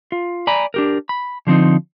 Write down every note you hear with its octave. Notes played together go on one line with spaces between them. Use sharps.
F4
D5 G#5 A#5 B5
D4 G4 A#4
B5
D3 F3 C4 D#4